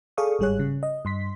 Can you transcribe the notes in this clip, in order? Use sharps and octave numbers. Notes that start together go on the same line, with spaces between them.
G#4 A4 D5 F5 C#6 D#6
G1 G#2 G3 G#4 C#5 F#6
C#3
D#5
G2 C6 B6